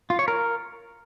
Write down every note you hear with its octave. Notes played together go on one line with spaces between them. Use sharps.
F4
C#5
A#4